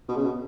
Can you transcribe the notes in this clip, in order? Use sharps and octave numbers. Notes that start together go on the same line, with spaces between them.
B2
C#3
B2